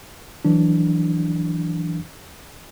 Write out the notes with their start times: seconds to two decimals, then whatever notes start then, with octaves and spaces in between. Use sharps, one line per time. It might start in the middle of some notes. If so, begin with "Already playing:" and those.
0.45 E3 F#3 D4